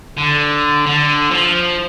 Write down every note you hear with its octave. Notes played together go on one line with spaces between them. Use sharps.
D3
D3
F3